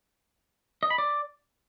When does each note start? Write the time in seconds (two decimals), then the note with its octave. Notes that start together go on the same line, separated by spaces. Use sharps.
0.83 D#5
0.90 B5
0.98 D5